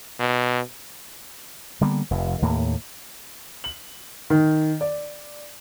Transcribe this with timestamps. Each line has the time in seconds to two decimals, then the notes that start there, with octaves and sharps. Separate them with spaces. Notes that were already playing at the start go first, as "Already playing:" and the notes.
0.19 B2
1.81 D3 G3 A#3 B3
2.11 F1 F2
2.42 D#2 A2 A#3
3.64 F#7
4.30 D#3
4.81 D5